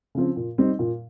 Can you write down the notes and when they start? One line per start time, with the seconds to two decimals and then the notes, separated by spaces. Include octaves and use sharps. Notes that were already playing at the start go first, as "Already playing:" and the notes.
0.15 C#3 F3 C4
0.37 A#2
0.58 G3 C4 D#4
0.79 A#2